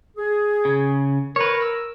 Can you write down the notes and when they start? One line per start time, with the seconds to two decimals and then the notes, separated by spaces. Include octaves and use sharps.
0.17 G#4
0.65 C#3
1.36 A#4 B4 C#5
1.62 E6